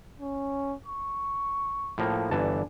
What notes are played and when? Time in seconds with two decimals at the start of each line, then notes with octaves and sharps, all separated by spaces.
0.20 C#4
0.86 C#6
1.98 A2 F3 A#3
2.31 G1 E3 D4 A5